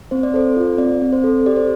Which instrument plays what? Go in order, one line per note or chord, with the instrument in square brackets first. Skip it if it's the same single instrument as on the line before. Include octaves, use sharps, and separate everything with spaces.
[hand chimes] C4 C5
D5
A4 C5
F4
C4 D5
C4
C5
A4
G4 D5
C5